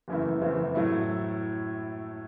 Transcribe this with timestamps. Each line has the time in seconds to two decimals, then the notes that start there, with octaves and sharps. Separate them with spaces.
0.08 F#1 F#2 E3 A3 E4
0.41 F#1 F#2 E3 A3 C4
0.75 A2 F#3 A3 E4